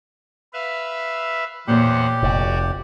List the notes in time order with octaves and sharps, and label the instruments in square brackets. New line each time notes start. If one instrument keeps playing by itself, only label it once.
[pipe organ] B4 E5 F5
[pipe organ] E2 C5 F#5 [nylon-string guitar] A#2 C#5 [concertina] G4
[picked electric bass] F1 [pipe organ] F#4 D5